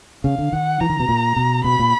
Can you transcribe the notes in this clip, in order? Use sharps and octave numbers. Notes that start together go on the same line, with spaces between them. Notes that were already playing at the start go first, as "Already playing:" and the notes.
C#3 F5
D3
D#3 F#5
E3 A#5
D#3
B2
A#2
B2
B2 B5
A#2